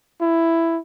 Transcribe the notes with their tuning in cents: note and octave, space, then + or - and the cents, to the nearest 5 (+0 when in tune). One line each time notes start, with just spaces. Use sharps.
E4 +10